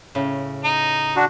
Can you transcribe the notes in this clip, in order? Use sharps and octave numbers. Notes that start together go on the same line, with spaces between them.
A2 C#3
D#4
D4 F#4